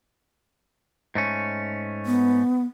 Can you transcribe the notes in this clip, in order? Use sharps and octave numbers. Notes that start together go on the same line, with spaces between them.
G#2 A3 C#4
B3